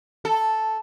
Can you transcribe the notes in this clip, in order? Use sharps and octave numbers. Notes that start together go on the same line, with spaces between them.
A4